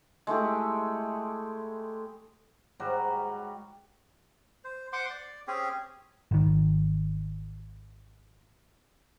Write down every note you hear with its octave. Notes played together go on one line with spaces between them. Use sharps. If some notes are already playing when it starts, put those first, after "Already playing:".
G#3 A3 E4 G4
G#2 F#3 G3 F#4
C5
C5 F#5 C6 D6
D5
C4 C#4 G4 G#4
G#1 D#3